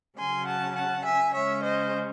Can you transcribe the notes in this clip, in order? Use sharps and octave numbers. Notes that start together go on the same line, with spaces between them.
C#3 F#3 C#4 G#5 C6
F#5 A5
F#5 A5
E5 G#5
C#3 G#3 C#4 C#5 E5
C5 D#5